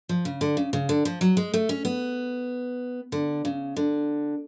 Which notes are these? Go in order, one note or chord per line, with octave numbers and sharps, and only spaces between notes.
F3
C#3
D3
C#3
C#3
D3
F3
F#3
G#3
A3
C#4
B3
D3
C#3
D3